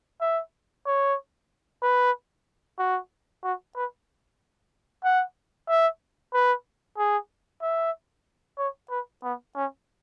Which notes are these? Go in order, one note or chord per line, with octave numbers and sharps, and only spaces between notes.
E5
C#5
B4
F#4
F#4
B4
F#5
E5
B4
G#4
E5
C#5
B4
B3
C#4